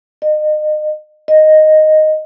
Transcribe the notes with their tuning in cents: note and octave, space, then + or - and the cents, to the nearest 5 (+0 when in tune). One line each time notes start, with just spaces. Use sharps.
D#5 -35
D#5 -5